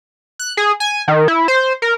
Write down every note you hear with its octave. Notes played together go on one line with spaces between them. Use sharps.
F#6
G#4
G#5
D#3
E4
C5
A#4